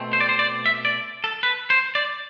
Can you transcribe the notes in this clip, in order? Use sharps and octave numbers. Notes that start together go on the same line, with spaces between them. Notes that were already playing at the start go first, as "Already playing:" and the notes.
Already playing: B2 A3 C4
C5
D5
C5
D5
E5
D5
A4
B4
C5
D5